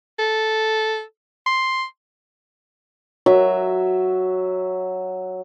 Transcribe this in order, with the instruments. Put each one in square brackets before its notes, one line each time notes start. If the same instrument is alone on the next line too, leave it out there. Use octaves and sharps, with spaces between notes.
[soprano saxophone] A4
C6
[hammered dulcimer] F#3 E5